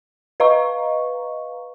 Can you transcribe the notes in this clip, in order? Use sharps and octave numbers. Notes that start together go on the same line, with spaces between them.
B4 D#5 F5 A#5 C#6